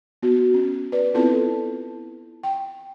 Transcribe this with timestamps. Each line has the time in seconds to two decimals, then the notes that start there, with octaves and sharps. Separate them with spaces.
0.23 B3 F#4
0.54 C#4
0.92 B4 D5
1.14 B3 C4 E4 F4 A4 A5
2.43 G5